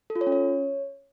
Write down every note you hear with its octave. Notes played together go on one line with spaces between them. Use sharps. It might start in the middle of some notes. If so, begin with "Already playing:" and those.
A4
F4
C#5
C#4
C#5